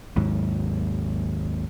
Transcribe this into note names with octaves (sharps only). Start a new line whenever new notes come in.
G#1 D#2 G#2 F#3